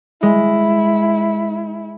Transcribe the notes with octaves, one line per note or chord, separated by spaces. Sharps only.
G#3 E4